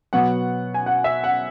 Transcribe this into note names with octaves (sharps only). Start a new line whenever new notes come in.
B2 F#3 B3 F#5
G#5
F#5
E5
F#5